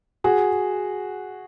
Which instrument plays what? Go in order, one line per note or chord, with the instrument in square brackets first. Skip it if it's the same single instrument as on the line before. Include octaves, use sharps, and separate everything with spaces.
[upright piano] F#4 G#4